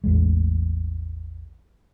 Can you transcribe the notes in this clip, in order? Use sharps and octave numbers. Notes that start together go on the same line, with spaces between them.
A1 E2 A2 G#3